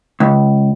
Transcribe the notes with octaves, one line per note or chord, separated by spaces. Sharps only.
C#2